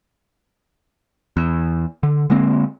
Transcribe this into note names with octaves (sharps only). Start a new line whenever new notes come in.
E2
D3
D3 G#3 A#3 C4